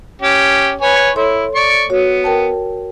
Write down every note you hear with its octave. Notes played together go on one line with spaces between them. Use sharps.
C#4 G4
B4 C#5 G#5
E4 A4 C#5 C6
D5 C#6
B3 F#4 C#5
A#4 G5 A5